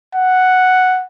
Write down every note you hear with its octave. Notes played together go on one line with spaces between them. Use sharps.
F#5